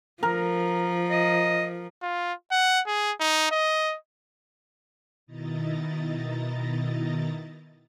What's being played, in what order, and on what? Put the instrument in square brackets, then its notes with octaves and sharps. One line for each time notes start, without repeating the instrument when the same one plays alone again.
[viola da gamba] F3 [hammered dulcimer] A#4
[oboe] D#5
[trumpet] F4
F#5
G#4
D#4
D#5
[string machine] B2 D#3 E4 D#5 A#5 A6